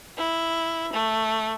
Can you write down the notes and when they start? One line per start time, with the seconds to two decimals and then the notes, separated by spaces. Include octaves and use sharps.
0.17 E4
0.94 A3